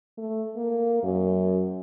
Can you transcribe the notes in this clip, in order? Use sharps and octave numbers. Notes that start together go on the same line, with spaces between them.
A3
A#3
F#2